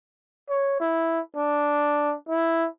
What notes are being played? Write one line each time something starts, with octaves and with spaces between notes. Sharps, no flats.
C#5
E4
D4
E4